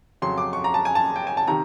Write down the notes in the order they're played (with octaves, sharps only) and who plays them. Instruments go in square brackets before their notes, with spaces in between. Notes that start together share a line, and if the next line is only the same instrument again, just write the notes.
[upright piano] F2 C#3 F#3 C6
D6
C#6
A#5
A5
G#5
A5
G5
G#5
A5
C3 D#3 A#5